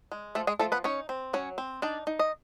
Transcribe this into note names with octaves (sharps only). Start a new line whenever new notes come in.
G#3
F3 A3 A4
G#3 G#4
F3 A3 A4
B3 B4
C#4 D#4 C#5
C4
F#3 C#4 C#5
C4
D4 D#4 D5
D#4
D#5